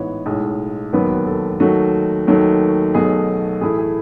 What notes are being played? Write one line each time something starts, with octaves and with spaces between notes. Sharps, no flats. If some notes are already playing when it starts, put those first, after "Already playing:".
Already playing: A1 G#2 E3 B3 E4 B4 C#5 D#5
B1 A2 G#3
E1 D#2 D#3 F#3 B3 B4
A4
D#2 D#3 F#3 A3 F#4
D#2 D#3 F#3 A3
B1 B2 F#3 A3 G#4
A2 E3 A3 E4 G#4
G#4